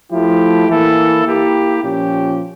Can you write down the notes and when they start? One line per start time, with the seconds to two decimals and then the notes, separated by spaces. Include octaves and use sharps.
0.11 F3 A3 E4 G4
0.68 E3 A#3 E4 A4
1.26 A#3 E4 G4
1.83 A#2 F3 C#4 G4